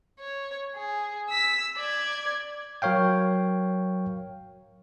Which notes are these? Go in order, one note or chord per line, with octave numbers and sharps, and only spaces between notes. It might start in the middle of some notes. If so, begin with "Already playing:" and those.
C#5
G#4
E6 B6
D5 G#6
F#3 A#4 C#5 F5 G5